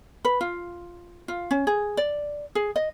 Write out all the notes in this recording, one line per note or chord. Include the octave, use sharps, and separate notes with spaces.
B4
F4
F4
C#4
G#4
D5
G#4
D#5